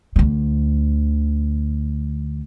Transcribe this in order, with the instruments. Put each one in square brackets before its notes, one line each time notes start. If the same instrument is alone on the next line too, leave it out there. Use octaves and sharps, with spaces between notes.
[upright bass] D2 D3